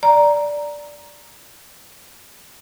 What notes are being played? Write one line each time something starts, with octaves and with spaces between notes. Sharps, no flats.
D5 A#5